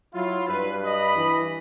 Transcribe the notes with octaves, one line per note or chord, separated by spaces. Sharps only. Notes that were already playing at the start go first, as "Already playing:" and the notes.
F#3 E4 F4
G2 B4
D#5 B5
E3